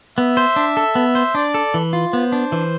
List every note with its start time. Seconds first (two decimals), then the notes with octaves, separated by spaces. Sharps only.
0.18 B3 E5
0.37 C5
0.56 D4
0.77 A4
0.95 B3
1.15 C5
1.35 D4 D5
1.54 A4
1.74 E3
1.93 F4
2.13 B3 C5
2.32 D4
2.52 E3